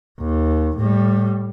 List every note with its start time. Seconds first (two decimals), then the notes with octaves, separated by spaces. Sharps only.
0.20 D#2
0.77 A2 G3